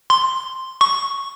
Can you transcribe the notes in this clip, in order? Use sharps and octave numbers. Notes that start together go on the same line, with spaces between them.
C6
C#6